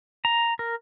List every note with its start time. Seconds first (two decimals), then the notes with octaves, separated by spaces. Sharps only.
0.25 A#5
0.59 A#4